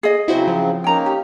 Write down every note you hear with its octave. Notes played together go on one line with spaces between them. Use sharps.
G#4 D#5
C#3 F#3 C4 E4 F#4 C5
F3
A#3 C#4 D#4 G5 A#5
G4